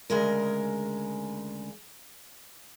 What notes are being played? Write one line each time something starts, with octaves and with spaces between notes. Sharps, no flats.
D2 C#3 G#3 A#4